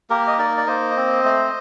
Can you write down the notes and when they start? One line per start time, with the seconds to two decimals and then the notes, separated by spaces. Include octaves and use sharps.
0.10 A#3 G4 A#4
0.27 D#5
0.38 D#4 A#4 D5
0.57 D5
0.67 A#3 C5 D#5
0.96 C4
1.25 A3